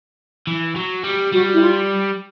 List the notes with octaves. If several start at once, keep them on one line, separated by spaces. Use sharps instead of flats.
E3
F#3
G3
G3 F#4
E4
F4